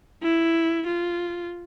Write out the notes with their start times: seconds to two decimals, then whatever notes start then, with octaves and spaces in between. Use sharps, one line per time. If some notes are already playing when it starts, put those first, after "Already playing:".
0.23 E4
0.88 F4